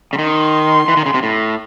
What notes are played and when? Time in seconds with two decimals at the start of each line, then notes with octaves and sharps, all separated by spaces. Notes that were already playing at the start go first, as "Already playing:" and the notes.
0.13 C#3
0.19 D#3 C6
0.88 E3
0.97 D#3
1.06 C#3
1.14 C3
1.23 A2